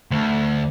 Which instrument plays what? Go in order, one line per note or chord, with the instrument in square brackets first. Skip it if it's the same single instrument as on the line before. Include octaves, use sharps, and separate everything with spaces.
[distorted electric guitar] D2